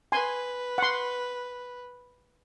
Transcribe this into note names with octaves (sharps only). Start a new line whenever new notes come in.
B4 G#5 C6
F#5 C6